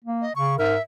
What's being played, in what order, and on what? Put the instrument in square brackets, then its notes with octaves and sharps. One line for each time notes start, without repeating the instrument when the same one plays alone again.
[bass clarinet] A#3
[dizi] D#5
[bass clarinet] C#3 [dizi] C#6
[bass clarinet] G#2 [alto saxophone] A#4 [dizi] E5